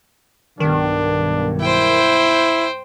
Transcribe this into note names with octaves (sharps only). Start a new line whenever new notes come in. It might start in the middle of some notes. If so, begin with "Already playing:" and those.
B1 G2 D#3 D4
E4 C5 G5